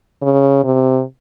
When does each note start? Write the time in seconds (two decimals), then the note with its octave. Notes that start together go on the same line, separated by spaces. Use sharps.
0.22 C#3
0.64 C3